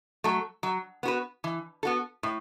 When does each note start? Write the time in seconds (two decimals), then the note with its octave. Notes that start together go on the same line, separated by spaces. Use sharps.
0.24 F#3 A3
0.63 F#3
1.03 B3 F#4 B4
1.44 E3
1.83 B3 F#4 A4
2.23 A2